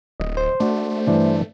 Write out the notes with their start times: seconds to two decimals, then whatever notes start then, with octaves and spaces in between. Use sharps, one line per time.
0.20 D1 D#5
0.37 C5
0.60 A3 D4 F#4
1.07 G2 E3 D4